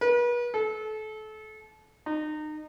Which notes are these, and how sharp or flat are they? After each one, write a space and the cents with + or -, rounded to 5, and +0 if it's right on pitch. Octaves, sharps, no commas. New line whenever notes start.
B4 -40
A4 -30
D#4 -30